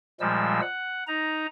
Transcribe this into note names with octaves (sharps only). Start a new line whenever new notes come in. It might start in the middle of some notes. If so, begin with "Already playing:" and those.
A#2 F3 G3 G#3 E6
F#5
D#4 A#5